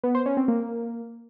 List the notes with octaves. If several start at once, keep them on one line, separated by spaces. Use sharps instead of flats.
B3
C5
C#4
C4
A#3